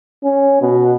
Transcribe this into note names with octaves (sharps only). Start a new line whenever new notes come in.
C#4
B2